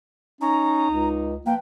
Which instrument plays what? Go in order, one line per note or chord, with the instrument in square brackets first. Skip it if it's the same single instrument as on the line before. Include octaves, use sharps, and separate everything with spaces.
[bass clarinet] C#4 [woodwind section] D#4 [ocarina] A#5
[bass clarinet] C#2
[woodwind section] F3 B4 [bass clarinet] A#3 [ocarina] G5